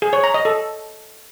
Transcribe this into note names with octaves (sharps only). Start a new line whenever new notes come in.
G#4
C#5
A#5
D#5
A4